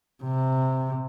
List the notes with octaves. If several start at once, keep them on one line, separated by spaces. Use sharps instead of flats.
C3